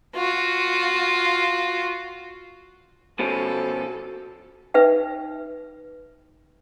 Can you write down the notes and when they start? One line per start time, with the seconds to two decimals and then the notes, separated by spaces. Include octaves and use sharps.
0.15 F4 F#4
3.19 B2 F3 C#4 A4
4.74 D#4 B4 E5 G5